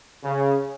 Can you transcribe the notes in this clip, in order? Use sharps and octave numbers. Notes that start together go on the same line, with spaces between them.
C#3